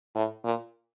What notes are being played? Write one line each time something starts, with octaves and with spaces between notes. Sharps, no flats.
A2
A#2